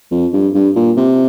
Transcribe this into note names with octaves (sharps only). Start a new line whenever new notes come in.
F2
G2
G2
A#2
C3